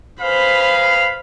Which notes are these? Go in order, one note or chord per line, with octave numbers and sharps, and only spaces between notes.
G#4 B4 C5 F5 B5